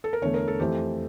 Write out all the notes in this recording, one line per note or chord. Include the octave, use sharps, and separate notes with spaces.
A4
A#4
E2 D3 A3 C#5
A#4
A4
F2 E3 A3 G4